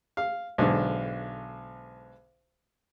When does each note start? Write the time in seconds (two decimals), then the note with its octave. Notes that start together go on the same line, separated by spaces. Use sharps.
0.17 F5
0.58 B1 G#2 D3